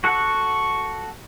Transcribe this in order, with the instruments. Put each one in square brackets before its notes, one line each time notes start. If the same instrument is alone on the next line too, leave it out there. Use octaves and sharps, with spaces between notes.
[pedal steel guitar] F#4 A4 F#5 [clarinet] C#6